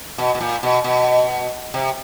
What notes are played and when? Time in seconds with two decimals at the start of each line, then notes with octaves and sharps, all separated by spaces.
0.18 B2
0.35 B2
0.41 A#2
0.63 B2
0.84 B2
1.74 C3